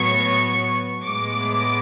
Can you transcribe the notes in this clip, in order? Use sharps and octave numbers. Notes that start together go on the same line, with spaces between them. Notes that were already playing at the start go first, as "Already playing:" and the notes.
Already playing: A2 F#3 B3 C#6
A2 G#3 B3 D6